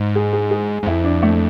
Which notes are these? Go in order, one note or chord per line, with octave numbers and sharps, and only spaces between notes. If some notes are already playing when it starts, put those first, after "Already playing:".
Already playing: G#2
G#4
G#4
G#4
G#2
F2 E4
D4
A3